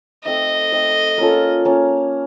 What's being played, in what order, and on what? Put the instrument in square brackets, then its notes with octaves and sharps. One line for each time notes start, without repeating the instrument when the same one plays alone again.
[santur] A3 C4 D#4 [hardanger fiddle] D#5
[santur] A3 C4 D#4
A#3 C#4 F4 A4
A#3 C#4